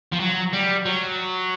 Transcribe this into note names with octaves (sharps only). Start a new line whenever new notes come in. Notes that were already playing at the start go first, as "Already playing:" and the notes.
F3
F#3
G3
F#3